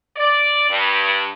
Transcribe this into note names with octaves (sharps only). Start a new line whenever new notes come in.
D5
G2